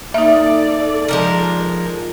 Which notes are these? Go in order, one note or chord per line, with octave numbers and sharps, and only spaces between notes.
A#3 D#4 A4 D5 E5
F3 G#3 A#4